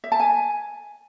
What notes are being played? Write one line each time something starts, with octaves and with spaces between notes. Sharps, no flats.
E5
A5
G#5